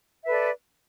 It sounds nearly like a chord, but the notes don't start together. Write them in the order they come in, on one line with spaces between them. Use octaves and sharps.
E5 B4 A4 D5